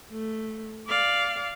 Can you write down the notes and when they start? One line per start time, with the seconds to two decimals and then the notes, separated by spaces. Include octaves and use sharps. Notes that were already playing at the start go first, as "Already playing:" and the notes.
0.11 A3
0.88 D5 F5